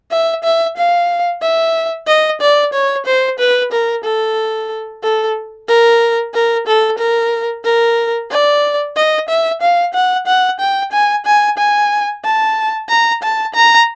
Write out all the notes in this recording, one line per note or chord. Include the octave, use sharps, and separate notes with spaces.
E5
E5
F5
E5
D#5
D5
C#5
C5
B4
A#4
A4
A4
A#4
A#4
A4
A#4
A#4
D5
D#5
E5
F5
F#5
F#5
G5
G#5
G#5
G#5
A5
A#5
A5
A#5